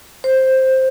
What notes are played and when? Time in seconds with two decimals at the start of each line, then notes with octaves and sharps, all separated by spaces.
0.24 C5